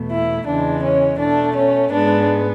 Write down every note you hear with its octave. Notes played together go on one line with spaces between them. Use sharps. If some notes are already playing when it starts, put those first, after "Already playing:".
Already playing: E2 B2 A3
E4
E2 C#3 E3 G#3 D4
C#4
B2 A3 D4
C#4
G#2 G#3 B3 D4